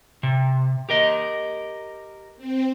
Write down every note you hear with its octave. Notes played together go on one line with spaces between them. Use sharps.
C3
G4 A#4 D#5
C4